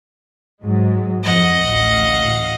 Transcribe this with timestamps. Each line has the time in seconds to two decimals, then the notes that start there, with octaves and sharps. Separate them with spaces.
0.62 G#2 F#3 G#3
1.23 F2 F3 D#5 F#5
1.64 A1 D2 F5